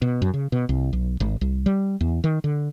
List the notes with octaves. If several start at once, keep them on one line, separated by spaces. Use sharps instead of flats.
B2
F#2
C#3
B2
C2
B1
G#1
C2
G3
E2
D#3
D3